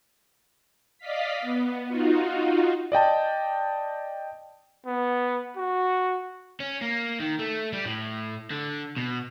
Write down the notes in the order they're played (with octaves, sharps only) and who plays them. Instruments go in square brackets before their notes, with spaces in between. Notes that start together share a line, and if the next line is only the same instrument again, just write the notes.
[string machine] D5 D#5 F5 B6
B3
D#4 F4 F#4
[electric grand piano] D5 D#5 G5 A5
[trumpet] B3
F#4
[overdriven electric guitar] C#4
A#3
D#3
A3
G3
A2
D3
B2